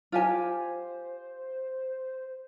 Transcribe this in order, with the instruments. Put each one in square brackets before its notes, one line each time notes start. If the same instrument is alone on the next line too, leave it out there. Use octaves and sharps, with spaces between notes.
[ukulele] F4 G4 G#5 [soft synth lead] C5